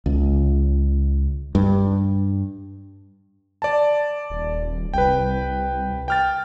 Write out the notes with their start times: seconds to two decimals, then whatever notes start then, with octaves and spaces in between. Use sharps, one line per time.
0.06 C#2
1.55 G2
3.62 D5 A5
4.30 D#1
4.94 C2 B4 G5
6.08 G5 F6 A6